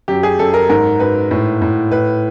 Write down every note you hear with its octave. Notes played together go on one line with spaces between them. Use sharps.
F#2 G4
G#4
F#2 A4
A#4
G#2 A#4
G#2 B4
A2
A2
A2 B4